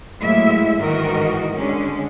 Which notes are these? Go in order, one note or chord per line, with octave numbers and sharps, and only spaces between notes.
A2 F#3 G#3 A#3 E4 E5
G#2 D#3 E3 F#4 A#4 D#5
D3 G#3 C#4